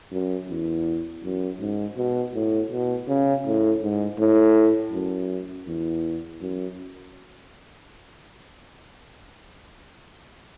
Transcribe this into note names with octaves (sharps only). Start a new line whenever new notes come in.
F#2
E2
F#2
G#2
B2
A2
B2
C#3
A2
G#2
A2
F#2
E2
F#2